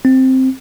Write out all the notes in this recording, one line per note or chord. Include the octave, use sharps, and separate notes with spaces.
C4